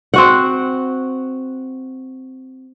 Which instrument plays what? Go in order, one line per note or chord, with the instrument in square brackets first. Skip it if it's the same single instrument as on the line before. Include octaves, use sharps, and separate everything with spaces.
[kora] C4 F#4 F#5